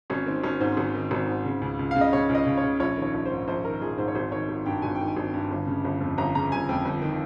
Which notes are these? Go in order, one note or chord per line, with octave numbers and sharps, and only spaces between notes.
G#1 C#4
D#3 C4
G#1 C#4
G#2 C5
G#1
D#3
G#1
G#2
C#3
C#2
C#2
C#3 F5
D#5
C#3 C#5
C#2
D#5
C#2
C#5
C#3
A#1 C#5
D#3
C#5
A#1
G#2 C5
A#1 C5
D#3 A#4
A#1 G#4
G#2 C5
C#5
G#1 C5
D#3 C#5
G#1
G2 G5
G#1 G#5
G5
D#3
G#5
G#1
G2
G1
C#3
G1
F2
G1 A#5
C#3 A#5
G1 G#5
F2 G5
G1
D#3